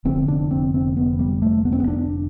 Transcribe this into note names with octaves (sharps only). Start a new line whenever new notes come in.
F1 F2 D3 C4
D4
C4
C4
B3
G3
A3
B3
C4
B3
D4